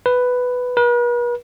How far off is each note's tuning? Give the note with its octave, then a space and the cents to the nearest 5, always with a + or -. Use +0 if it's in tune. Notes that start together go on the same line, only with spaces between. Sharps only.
B4 +5
B4 -45